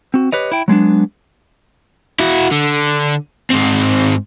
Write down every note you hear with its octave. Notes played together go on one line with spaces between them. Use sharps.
C4 F#4
G4 B4 C#5 D#5
E4 G5
F#3 G#3 B3 D4
E4 F#4
D3
G#2 C4